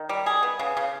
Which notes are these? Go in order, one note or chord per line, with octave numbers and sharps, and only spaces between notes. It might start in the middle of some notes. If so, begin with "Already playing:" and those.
Already playing: D#3
G3
G#4
B3
C#3
C#3